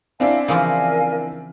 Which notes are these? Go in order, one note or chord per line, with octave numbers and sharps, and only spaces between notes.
C4 D4 E4 F5 G#5 C6
C#3 E3 F3 A#4 F5 G#5